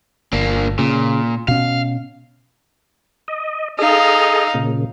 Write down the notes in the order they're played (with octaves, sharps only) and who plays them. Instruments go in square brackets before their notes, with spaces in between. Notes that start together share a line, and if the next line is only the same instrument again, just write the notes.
[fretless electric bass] G1 [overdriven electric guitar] A#3 D4
[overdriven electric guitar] A#2 [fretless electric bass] C#3
[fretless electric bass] B2 C#4 [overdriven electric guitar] F5
[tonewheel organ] D#5
[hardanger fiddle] D#4 F5 [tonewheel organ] G#4 A4 D#5
[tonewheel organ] A#2 C#3